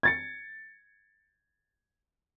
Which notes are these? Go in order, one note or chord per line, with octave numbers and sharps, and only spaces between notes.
G#6 A6 C#7